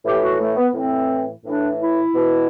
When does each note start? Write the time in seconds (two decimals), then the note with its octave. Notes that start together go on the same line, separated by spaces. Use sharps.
0.04 A2 E3 G4
0.21 F#4
0.38 A3
0.56 B3
0.74 A2 E3 C4
1.44 A2 E3 D4
1.79 E4
2.15 B2